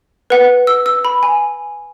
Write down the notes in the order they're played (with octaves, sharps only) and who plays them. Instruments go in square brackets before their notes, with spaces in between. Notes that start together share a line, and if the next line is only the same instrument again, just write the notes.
[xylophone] B4 F#5
E6
E6
B5
G#5